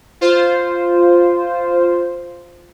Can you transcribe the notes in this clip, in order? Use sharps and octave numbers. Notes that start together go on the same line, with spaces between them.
F4 C5